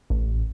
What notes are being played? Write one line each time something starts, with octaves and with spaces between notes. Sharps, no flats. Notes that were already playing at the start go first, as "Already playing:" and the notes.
A1